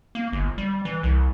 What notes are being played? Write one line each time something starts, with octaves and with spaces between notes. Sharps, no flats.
A#3
G1
G3
E3
C2